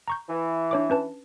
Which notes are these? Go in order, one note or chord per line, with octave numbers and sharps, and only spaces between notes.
A#5 C#6 G6
E3
D4 C#5 D6
C#4 B4 A5